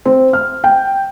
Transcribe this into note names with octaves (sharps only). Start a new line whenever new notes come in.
C4
F6
G5